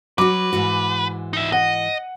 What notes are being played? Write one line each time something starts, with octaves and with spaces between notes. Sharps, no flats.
F#3 F#4 B4 D6
G#2 E3 F#4
D#4 E5
D#5 F#5